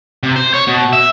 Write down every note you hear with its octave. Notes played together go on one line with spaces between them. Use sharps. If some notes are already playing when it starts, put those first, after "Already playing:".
C3
C5
C#5
B2
E5